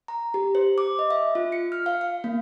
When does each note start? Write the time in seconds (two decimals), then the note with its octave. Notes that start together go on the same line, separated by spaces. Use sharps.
0.08 A#5
0.34 G4
0.55 C5
0.78 D6
0.99 D#5
1.10 E5
1.35 F4
1.52 C#7
1.72 F6
1.86 F5
2.01 F5
2.24 A#3